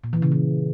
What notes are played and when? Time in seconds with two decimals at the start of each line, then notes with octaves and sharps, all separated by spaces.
0.04 A#2
0.13 E3
0.22 C#3
0.32 E3